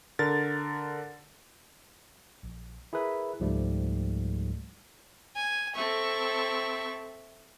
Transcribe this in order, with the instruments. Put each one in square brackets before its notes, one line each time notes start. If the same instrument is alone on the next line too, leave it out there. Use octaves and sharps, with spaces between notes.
[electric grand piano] D3 A#4 A6
[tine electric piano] A#1
E4 G#4 A#4 B4 E5
C#2 G#2 F3 G3 A3
[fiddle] G#5
[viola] C4 A4 [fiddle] E5 C#6